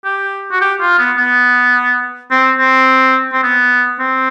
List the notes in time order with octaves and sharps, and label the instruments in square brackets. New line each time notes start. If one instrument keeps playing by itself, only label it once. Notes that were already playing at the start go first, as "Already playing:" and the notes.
[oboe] G4
F#4
G4
F4
B3
B3
C4
C4
C4
B3
C4